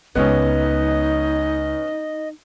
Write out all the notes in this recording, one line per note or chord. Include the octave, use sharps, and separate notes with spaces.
C#2 G#3 B3 C#4 D#4 D#5